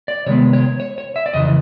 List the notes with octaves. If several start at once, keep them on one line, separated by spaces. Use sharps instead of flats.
D5
C3 D#3 G#3 B3 C#5
C#5
C#5
C#5
E5
D5
F2 C#3 E3 D#5